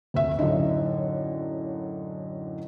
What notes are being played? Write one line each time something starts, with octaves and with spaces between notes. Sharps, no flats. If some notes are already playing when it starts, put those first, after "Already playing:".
F1 D2 E5
F#2 A2 D3 D#4